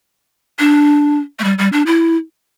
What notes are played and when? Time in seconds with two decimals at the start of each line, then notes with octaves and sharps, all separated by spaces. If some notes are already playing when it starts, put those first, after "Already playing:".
0.59 D4
1.39 A3
1.44 G3
1.58 G3
1.73 D4
1.86 E4